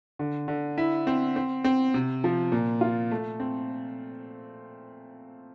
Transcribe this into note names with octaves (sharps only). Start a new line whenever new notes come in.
D3
D3
E4
C4
C4
C4
C3
F3
A#2
F4
A3
C4